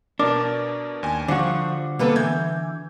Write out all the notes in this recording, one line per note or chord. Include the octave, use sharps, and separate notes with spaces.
B2 D4 A#4 D6
D#2 G#5
D3 F3 G3 F#4 F#5
G3 A#3 B3 A4 B4
E3 G6 G#6